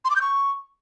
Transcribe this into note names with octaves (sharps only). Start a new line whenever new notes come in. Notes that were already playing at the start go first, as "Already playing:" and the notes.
C6
D6
G6
C#6